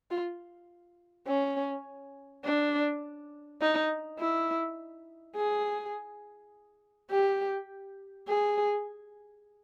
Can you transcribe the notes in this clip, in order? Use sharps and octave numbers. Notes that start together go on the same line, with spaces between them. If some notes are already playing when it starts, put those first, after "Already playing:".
F4
C#4
D4
D#4
E4
G#4
G4
G#4